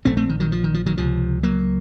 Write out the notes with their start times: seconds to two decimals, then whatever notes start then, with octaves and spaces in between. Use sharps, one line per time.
0.05 A#1 A2 A3 C4
0.17 A3 C4
0.29 D#3
0.40 D#3 F#3
0.52 F3
0.64 D#3
0.74 F3
0.86 D#3 F#3
0.97 C#2 C3 F3
1.43 F#3 A#3